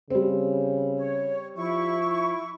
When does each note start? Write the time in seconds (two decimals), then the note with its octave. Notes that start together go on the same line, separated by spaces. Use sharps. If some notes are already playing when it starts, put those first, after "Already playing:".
0.10 C#3 G3 C4
0.97 C#5
1.57 F3 E4 C#6